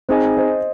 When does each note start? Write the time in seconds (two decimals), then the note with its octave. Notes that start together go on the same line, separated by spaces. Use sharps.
0.09 C4 D#4 G#4 C5 D#5 G#5
0.37 C5 D#5